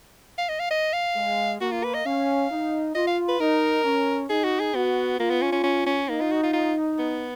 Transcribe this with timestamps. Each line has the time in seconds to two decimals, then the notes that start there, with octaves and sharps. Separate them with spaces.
0.38 F5
0.49 D#5
0.59 F5
0.71 D#5
0.93 F5
1.16 G#3
1.61 A#3 F#4
1.72 F4
1.84 B4
1.95 D#5
2.05 C#4 F5
2.51 D#4
2.95 F4 D#5
3.07 F5
3.29 B4
3.40 D#4 A#4
3.85 C#4
4.29 D#4 G#4
4.44 F#4
4.60 G#4
4.74 B3 F#4
5.19 A#3 F4
5.30 B3
5.42 C#4
5.52 C#4
5.64 C#4
5.86 C#4
6.09 A#3 D#4
6.21 F4
6.31 F#4
6.43 F4
6.53 F4
6.99 B3